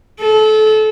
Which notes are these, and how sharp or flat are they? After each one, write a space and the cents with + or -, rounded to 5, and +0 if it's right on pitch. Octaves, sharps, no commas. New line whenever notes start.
A4 -30